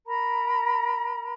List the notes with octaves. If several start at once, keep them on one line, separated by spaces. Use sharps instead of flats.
A#4 A#5 B5